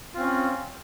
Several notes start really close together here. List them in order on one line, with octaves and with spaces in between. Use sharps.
F4 C4 C#4